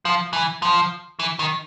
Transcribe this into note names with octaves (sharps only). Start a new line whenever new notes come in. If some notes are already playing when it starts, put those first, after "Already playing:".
F3
E3
F3
E3
D#3